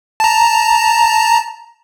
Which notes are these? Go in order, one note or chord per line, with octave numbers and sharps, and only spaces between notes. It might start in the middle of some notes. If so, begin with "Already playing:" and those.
A5 A#5